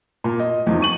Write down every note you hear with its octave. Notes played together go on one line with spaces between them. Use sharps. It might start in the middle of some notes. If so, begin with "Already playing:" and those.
A#2
D#5
E2 F3 D#4
C#6 D#7 F#7